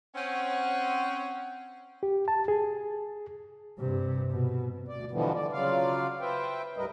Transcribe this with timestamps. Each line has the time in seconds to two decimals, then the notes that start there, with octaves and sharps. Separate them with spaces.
0.15 C4 C#4 F#5
2.03 G4
2.28 A5
2.48 G#4
3.79 G2 C3
4.30 B2
4.88 D2 D5
5.11 B2 D3 E3 F3 G3 B3
5.35 D3 D5
5.52 C#3 F#3 F4 D5 F5
6.20 B4 C5 E5 G5
6.77 D2 G#2 G3 A#4 B4 D#5